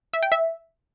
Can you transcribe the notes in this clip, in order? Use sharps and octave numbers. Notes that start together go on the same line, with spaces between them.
E5
G5
E5